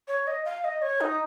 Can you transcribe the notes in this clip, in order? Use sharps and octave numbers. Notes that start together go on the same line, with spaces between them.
C#5
D#5
F5
D#5
C#5
D#4